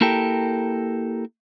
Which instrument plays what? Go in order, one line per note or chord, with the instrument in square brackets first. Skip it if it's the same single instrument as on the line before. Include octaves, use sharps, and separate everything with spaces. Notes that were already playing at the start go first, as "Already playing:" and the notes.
[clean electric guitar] A#3 E4 G4 A4 A#4 G5